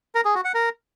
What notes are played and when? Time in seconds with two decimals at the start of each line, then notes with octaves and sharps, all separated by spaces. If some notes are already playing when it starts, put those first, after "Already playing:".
0.15 A#4
0.25 G#4
0.35 F#4
0.45 F#5
0.54 A#4